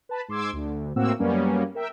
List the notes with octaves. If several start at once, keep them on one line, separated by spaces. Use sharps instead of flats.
B4 A5 B5
G#2 C6 D6 E6 G#6
D2
A2 A#3 C4 F#4 E6
F#2 G3 A#3 B3 C#4
A#4 E5 G5